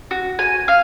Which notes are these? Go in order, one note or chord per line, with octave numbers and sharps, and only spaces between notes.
F#4
G#5
F5